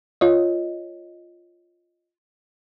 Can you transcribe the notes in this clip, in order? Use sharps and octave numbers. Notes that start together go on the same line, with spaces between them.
F4 C#5 D#5